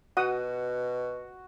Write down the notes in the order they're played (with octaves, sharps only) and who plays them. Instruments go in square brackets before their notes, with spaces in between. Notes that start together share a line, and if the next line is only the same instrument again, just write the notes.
[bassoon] B2 [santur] F#4 [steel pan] F#5 D#6